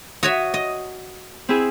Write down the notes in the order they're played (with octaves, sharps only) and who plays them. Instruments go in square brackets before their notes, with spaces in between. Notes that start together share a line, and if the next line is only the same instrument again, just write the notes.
[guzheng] F#4 C#5 E5 [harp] D#6
[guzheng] D#5
[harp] C4 E4 G#4